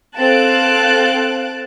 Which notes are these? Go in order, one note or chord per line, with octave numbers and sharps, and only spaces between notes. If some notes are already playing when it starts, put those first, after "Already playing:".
C4 A4 F5 A5 F#6 D7